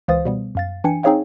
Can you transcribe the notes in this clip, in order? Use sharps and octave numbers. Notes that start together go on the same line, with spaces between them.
C#2 E3 C5 F5 D#6 A6
B2 G3 B3
F#2 F5 A6
E3 D4 G5 G#5 C#7
C4 D#4 G#4 C#5 F5 G5